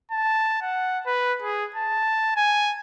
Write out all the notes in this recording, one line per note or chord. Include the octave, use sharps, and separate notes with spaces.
A5
F#5
B4
G#4
A5
G#5